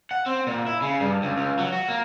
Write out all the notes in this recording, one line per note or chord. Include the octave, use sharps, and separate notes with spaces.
F#5
C4
A#2
E4
C#3
G2
C#2
C#2
F#3
F#4
A#3